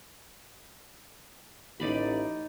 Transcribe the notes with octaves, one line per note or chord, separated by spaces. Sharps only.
A1 D#4 D5 B5